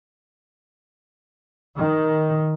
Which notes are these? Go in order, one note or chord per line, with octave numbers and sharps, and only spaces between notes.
D#3